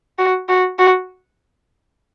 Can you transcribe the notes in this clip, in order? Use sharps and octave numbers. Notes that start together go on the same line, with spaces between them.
F#4
F#4
F#4